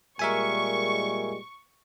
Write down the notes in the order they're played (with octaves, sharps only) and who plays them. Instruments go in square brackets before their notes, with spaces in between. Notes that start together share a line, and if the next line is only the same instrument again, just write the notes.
[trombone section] A#2 G3 G#3 [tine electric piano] A#4 E5 G#5 [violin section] C#6